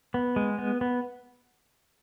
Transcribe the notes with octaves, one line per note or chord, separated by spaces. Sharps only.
B3
G#3
B3
B3